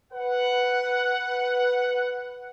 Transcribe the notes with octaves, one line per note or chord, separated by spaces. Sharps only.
B4 F#5